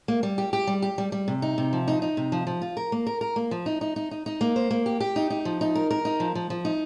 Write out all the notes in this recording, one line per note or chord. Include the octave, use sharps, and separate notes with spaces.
A#3
G3
G4
G4
G3
G4
G3
G3
C3
D#4
C3
F3
D#4
D#4
C3
F3
F3
F4
A#4
A#3
A#4
A#4
A#3
F3
D#4
D#4
D#4
D#4
D#4
A#3
C5
A#3
G4
G4
D#4
D#4
F3
D#4
A#4
A#4
D#4
F3
F3
F3
D#4